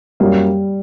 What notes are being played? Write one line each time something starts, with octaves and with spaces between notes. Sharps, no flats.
F#2 F#3 G3 A#3